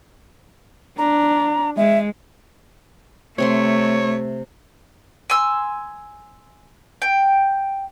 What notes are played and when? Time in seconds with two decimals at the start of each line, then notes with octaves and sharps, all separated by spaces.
0.98 D4 A#5
1.77 G#3 E5
3.38 C3 A3 C4 C#5 C6
5.30 G#5 C6 E6
7.02 G5